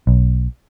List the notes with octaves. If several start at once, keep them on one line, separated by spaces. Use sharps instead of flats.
B1